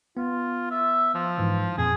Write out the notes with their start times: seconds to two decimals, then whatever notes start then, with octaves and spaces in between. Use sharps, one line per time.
0.17 B3 F4
0.71 E5
1.15 F3
1.38 G#2 E3
1.78 F2 A#2 G#4